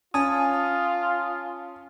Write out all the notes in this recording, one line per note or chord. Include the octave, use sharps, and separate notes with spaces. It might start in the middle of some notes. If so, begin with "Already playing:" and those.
C#4 F4 G#5 A5 D#6